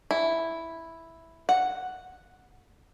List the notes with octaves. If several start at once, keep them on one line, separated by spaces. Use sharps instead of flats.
E4
F#5